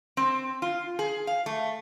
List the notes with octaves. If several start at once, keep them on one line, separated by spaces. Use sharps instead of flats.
C4
F4
G#4
F5
A3